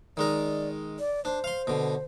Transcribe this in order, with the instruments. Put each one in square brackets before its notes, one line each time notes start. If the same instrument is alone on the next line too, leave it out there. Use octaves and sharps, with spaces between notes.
[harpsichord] D#3 G#3 A#4 [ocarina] D5
[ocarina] D5
[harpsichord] D4 [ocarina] C5
[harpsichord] F5 C6
B2 D3